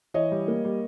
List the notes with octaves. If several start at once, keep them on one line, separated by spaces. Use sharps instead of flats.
E3 C#5 D#5
G3
A#3
G3